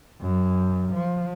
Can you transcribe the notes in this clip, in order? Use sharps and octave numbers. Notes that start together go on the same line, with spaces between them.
F#2
F3